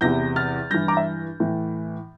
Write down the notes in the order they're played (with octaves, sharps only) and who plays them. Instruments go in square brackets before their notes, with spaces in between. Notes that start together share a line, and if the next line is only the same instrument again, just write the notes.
[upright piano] E2 C3 E3 G6 A#6
F6 A6
G2 E3 G6 A#6
A#5 D6
E5
A2 E3